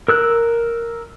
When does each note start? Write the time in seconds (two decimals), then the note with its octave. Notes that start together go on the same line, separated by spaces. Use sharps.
0.08 A#4 E6 F#6